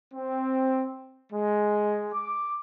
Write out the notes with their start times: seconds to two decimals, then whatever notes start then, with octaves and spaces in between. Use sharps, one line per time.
0.14 C4
1.32 G#3
2.14 D6